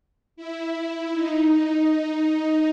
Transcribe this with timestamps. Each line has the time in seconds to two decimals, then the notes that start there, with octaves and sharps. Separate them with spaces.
0.36 E4
1.12 D#4